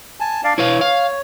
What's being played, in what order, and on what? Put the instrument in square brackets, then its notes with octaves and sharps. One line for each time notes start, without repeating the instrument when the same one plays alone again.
[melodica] G#5 A5
D4 D5 F5
[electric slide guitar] E4 B4 F5 [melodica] C#5
[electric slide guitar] F5